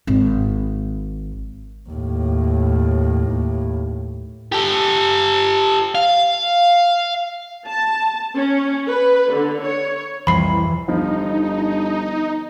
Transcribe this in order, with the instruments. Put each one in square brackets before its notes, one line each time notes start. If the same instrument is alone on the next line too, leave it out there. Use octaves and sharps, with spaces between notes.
[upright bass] G#1 D#3
[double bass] D#2 A2
[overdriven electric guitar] G4 A4
F5
[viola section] A5
C#4
B4
D3
C#5
[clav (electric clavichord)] C2 F2 C5 [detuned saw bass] E3 [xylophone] B5 C7
[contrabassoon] G1 [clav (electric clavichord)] F3 [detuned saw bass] D#4